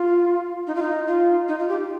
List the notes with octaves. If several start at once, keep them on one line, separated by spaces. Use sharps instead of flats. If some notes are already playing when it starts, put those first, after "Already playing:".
Already playing: F4
D#4
F4
D#4
F4
D#4
F4
G4